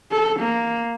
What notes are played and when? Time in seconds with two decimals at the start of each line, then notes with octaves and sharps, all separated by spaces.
0.11 A4
0.40 A#3